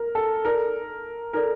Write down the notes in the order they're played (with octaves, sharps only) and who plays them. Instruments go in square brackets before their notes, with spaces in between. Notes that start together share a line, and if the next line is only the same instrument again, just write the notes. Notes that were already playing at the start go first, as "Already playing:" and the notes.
Already playing: [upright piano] A#4
A4
[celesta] D#4 A4 D5 [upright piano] A#4
[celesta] D#4 A4 D5 [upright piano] A#4